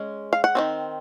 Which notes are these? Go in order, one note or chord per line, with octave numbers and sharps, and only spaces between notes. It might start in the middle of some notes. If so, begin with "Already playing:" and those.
Already playing: G#3 C#4
F5
F#5
D#3 F#3 C4